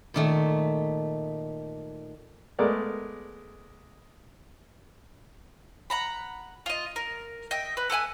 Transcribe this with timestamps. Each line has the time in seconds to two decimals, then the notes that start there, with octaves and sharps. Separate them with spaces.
0.14 A#2 D#3 A3
2.59 G#3 A3 B3 A#4 D5
5.90 F#5 A#5 B5
6.66 F4 D#5
6.96 A#4
7.51 D#5 E5 G5
7.77 B4
7.90 A4 B4 F#5 G#5